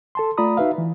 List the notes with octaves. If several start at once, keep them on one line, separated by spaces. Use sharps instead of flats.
A4 A5 C6
A3 F4 D5 A#5 B5 D#6
D#4 F#4 B4 E5 F5
E3